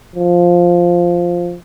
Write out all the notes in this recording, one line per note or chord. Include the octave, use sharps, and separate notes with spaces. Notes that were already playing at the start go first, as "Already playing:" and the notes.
F3